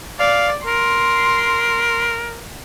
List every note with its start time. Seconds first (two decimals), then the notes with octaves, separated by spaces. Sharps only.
0.20 D5 F5
0.66 A#4 C6